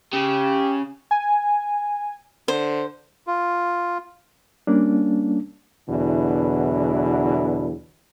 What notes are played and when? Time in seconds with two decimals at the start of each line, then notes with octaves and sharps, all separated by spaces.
0.13 C#3 G4
1.11 G#5
2.48 D3 C5
3.27 F4
4.67 G3 A#3 C#4 D4
5.89 E2 B2 D3 F#3 D4 E4